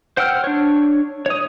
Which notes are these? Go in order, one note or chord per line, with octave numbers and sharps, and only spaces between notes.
C5 F#5 G5 E6 F6
D4 C#5
C#5 D#6